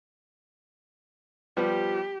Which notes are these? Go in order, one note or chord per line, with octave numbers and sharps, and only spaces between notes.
F3 G3 B3 G4